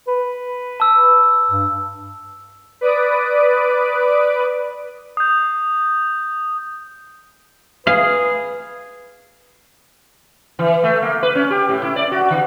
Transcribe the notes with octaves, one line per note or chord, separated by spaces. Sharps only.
B4
A5 E6
G2
B4 D5 D#6 D7
D#6 G6
G#4 B4 F5
E3
A3
A#3
B4
C#4
G4
A2
E4
D5
F#4
D#3